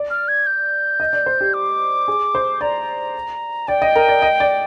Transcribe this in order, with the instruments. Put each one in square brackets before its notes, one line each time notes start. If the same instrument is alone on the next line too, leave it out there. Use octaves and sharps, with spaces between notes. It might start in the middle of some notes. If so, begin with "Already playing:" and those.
Already playing: [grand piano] D5
[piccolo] F6
G#6
G6
[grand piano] D#5
D5
C5
G4
[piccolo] D6
[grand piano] G#4
C5
[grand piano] D5 [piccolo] A#5
[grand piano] D5 [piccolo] G5
[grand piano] D#5
A#4
D5
D#5
D5